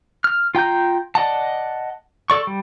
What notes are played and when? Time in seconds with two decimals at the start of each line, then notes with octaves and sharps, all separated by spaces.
0.24 F6
0.55 F4 G5 A#5 G6
1.15 D5 D#5 F#5 A5
2.30 A4 D5 C#6
2.47 G3